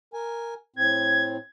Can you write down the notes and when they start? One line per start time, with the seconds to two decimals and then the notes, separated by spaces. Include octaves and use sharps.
0.13 A#4 G#5
0.76 A2 C4 G#6